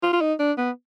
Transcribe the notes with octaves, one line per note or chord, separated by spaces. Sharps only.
F4
F4
D#4
D4
B3